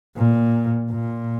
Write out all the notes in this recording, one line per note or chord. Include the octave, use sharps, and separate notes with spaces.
A#2
A#2